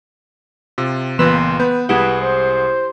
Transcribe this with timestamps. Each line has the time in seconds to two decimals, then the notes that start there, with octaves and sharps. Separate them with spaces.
0.78 C3 F4
1.19 C#2 A#2 E3 B3 B4 C6 E7
1.60 B3 B4 G6
1.89 C2 G#3 E4 G4 G#4 B4 F#5
2.22 C5